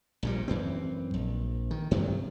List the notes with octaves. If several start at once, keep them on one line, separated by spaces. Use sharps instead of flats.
A#1 A#2 G3
F#2 E3 C4
A#1
D#3
G2 C3 D#3 F#3